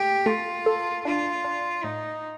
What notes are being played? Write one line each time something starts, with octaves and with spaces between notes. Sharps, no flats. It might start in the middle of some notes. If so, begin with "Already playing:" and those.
Already playing: A3 G4
A3 F4
A4
D4 F4
D4
A2 D#4